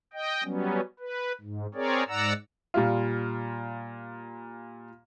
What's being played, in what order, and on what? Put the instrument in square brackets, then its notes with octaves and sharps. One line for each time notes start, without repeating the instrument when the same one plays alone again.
[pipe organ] D#5 G5
F#3 G3 B3 C#4
B4
G#2
C4 G#4 A#4 C#5 D5
G#2 D5 F#5 A#5 E6
[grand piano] A#2 G3 F4